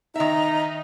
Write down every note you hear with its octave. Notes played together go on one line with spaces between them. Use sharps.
D#3 D#4 E5 A#5